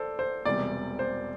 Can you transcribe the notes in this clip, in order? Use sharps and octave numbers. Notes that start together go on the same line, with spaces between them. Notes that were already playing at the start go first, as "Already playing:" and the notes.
Already playing: A4 C5 D5
C5
E1 E2 C3 G3 D5
C5